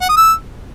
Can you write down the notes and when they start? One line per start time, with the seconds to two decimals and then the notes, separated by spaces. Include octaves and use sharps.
0.01 F#5
0.09 D#6
0.17 E6